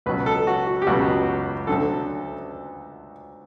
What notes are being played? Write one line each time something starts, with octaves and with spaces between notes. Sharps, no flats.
C#2 B2 F#3 B4
A4
F#4
F#4
G4
C#2 B2 F#3 F#4
D2 D3 F#3 A4